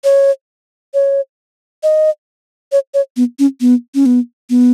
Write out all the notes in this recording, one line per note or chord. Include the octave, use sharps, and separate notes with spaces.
C#5
C#5
D#5
C#5
C#5
B3
C#4
B3
C#4
B3
B3